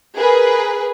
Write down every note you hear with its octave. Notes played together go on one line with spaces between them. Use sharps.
G#4 A#4 B4